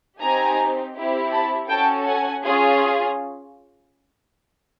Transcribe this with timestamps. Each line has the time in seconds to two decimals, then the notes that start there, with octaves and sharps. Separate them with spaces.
0.21 C4 D#4 G4 G#5 A#5
0.95 C4 E4 G4
1.32 A5 B5
1.69 C#4 F#4 A4 G5 A5
2.06 F#5 G#5
2.43 C#4 F4 G#4